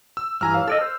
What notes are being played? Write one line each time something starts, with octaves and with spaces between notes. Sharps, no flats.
E6
G2 E3 G#5 A#5 F6
C#5 F5
A4 D5 D#5 E6
C5